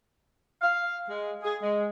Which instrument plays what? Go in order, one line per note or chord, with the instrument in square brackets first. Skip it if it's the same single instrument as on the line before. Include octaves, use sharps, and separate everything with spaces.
[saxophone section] F5
G#3
G#4
G#3